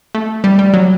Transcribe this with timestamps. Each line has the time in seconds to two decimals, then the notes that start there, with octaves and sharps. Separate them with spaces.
0.15 A3
0.44 G3
0.59 G3
0.74 F#3